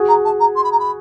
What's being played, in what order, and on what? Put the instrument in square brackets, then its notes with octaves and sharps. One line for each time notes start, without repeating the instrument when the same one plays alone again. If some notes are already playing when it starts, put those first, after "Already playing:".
Already playing: [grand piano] F#4 G#4
[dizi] A#5
A5
A#5
C6
B5
A#5
B5